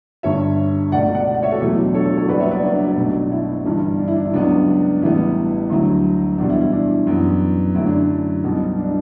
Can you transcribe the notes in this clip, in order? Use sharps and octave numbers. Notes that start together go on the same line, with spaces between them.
G1 G2 D3 C#5 E5
C#2 B2 A3 D5 F#5
D5 F#5
D5 F#5
C#5 E5
F#4 A4
E2 B2 F#3 A3 E4 G4
E4
D4
A4 C#5
A4 C#5
A4 C#5
F#1 F#2 C#3 G3 B3 B4 D5
C#5 E5
B4 D5
D4 F#4
B1 B2 A3
E4
G1 G2 E3 G3
D4
E4
D4
E4
C#2 C#3 F#3 B3 D4
A1 A2 E3 G3 B3 E4
D2 D3 F#3 E4
E2 B2 G3 D4
E4
E4
D4
F#2 E3 B3
F#2 D3 F#3 A3 E4
D4
D4
B1 B2 G3 B3
D4